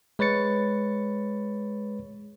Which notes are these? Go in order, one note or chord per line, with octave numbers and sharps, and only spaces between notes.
G#3 B4 C#5 A6 C#7